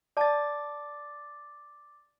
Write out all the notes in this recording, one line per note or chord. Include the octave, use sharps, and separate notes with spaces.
D5 A5 D6 A6